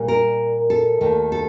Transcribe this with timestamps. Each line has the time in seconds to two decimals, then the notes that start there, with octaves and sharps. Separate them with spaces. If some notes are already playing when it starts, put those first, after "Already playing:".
Already playing: A#2 G3
0.08 A#4
0.70 A4
1.01 D#2 D#3 A3
1.32 A4